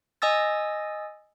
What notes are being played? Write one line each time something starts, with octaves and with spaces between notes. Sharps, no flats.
D#5 G#5 D#6 E6 A6